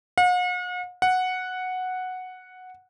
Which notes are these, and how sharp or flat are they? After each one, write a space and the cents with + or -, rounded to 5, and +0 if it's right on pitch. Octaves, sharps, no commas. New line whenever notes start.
F#5 -45
F#5 -5